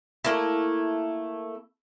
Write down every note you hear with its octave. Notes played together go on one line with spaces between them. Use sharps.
A3 A#3 E4